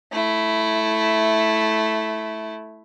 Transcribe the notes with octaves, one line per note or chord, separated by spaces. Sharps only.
A3 E4